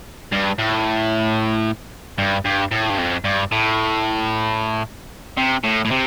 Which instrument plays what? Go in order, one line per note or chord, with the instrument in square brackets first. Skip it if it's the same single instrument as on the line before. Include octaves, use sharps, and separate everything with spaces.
[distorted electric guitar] G2
A2
G2
G2
A2
G2
F2
G2
A2
C3
A2
A2
C3